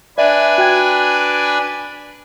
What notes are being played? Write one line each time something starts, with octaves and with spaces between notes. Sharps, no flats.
D4 B4 D5 E5 G#5
F#4 G5 G#6